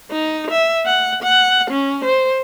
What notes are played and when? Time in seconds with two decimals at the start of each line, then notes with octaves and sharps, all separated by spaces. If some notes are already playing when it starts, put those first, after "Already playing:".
0.11 D#4
0.51 E5
0.86 F#5
1.23 F#5
1.71 C#4
2.05 C5